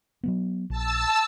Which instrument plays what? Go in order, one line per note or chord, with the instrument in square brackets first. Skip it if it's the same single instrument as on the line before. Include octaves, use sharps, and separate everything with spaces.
[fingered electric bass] F#3 G3 B3
[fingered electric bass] A#1 [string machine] A5 E6